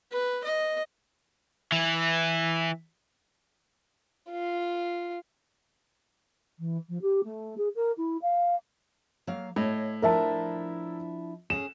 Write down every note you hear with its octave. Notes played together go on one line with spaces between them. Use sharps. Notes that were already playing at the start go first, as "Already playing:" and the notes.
B4
D#5
E3
F4
E3
F3
G4
A3
G#4
A#4
E4
F5
F#3 A#3 F5
A2 C#5 D#5
F3 D4 E4 A#4 E5 A5
C#4 G#4 E7